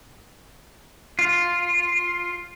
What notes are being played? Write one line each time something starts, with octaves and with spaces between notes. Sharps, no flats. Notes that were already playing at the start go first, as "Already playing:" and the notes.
F4